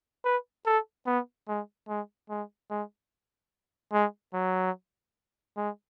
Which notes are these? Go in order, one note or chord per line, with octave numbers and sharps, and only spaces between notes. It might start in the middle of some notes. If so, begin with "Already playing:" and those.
B4
A4
B3
G#3
G#3
G#3
G#3
G#3
F#3
G#3